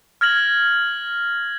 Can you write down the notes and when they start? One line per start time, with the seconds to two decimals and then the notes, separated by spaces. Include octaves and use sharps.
0.21 F6 G#6 A#6 F#7